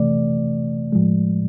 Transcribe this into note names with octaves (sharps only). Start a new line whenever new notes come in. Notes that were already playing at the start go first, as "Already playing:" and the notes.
Already playing: C3 E3 A3 D5
A2 F3 G#3